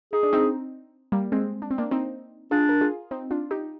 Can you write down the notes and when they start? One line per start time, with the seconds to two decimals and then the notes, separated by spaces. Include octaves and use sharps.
0.13 D#4 G#4
0.23 D4
0.33 C4 D#4
1.12 G3 A#3
1.32 G#3 C4
1.62 D4
1.70 C4
1.78 A#3 D4
1.91 C4 D#4
2.51 D4 F4 G#4
2.69 A#4
2.81 F4 G#4
3.11 C4 D#4
3.31 D4 F4
3.51 D#4 G4